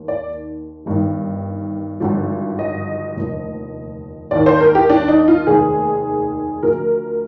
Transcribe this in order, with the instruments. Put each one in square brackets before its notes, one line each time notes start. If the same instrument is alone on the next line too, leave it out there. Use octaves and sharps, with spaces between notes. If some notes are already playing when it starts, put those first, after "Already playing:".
Already playing: [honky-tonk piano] D#2 D#3
D5
G1 G2 D#3
G#1 G2 D3 F3
D#5
F1 D#2 D3 F3
D#2 D#3 D5
C5
A#4
G4
D4
D#4
F4
F1 D#2 D#3 G#4
D2 D3 F3 A#4